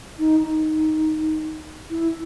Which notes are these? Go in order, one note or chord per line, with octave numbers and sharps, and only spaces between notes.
D#4
D#4
E4